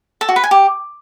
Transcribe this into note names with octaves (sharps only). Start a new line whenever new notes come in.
A4
F#4
B4
G#5
G4